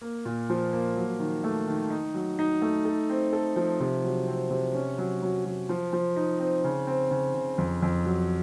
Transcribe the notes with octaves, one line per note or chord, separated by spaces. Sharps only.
A#3
A#2
F3
A#3
F#3
D#3
A3
D#3
D#4
F#3
D#4
A3
A4
C4
A4
F3
C3
F#3
C4
C3
C#4
F#3
F#3
F#3
F3
F3
D#4
C4
C#3
C4
C#3
C#3
F2
F2
F#3